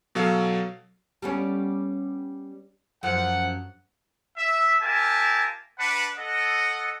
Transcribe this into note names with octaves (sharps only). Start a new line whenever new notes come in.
B2 F#3 A4 F5
G3 B3 C#4
F#2 F3 F#5
E5
F4 G4 A#4 E5 G#5 A5
D4 B4 F#5
A4 D#5 F#5